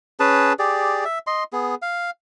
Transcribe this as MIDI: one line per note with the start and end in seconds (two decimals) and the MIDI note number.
0.20 0.53 61
0.20 0.53 68
0.20 0.53 71
0.20 0.53 81
0.59 1.04 67
0.59 1.04 68
0.59 1.04 74
1.05 1.19 76
1.27 1.44 75
1.27 1.44 84
1.53 1.75 59
1.53 1.75 68
1.82 2.10 77